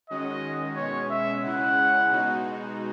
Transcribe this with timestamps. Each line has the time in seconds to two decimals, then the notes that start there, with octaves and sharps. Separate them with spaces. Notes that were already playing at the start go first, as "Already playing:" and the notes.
0.10 D#3 G#3 C#4 F#4 D#5
0.76 B2 G#3 C#4 C#5
1.10 E5
1.43 C#3 G#3 C#4 E4 F#5
2.09 B2 G#3 D#4 F#4